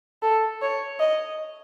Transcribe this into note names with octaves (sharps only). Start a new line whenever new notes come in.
A4
C#5
D#5